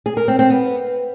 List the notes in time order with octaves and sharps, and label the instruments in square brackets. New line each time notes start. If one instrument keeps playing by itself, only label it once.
[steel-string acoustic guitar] G#4
A#4
C4
C4
B3